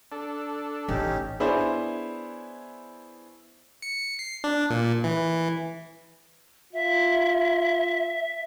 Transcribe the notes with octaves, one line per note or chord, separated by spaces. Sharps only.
D4 A4
A1 C#4 D#4 G4
B3 D4 E4 G#4 C5 C#5
C#7
C7
D4
A#2
E3
F4 E5